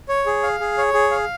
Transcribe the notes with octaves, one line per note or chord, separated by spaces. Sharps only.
C#5
G#4
F5
G#4
C#5
G#4
F5